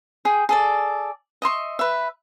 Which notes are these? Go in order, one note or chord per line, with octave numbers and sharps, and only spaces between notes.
G#4 G5
G#4 A4 D5
D#5 E5 C6 C#6
B4 E5